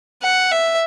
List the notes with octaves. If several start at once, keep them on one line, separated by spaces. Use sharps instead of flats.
F#5
E5